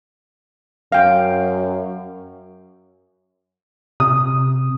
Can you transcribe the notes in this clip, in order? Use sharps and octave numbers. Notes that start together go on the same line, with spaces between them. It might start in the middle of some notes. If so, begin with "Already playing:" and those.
F#2 F5 G5
C3 D#6